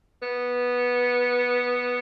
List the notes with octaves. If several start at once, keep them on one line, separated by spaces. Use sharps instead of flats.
B3